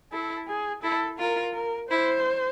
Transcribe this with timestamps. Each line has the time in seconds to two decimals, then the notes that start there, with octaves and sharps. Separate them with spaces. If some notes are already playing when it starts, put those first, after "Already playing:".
0.11 E4 A4
0.47 G#4
0.82 E4 A4
1.18 F4 A#4
1.54 A#4
1.89 E4 C5